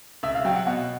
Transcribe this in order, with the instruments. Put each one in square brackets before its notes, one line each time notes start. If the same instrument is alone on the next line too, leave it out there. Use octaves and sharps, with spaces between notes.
[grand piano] C#2 [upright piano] E5
[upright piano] F5
[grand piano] F#3 [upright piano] G5
[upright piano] F#5
[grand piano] B2 [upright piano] F#5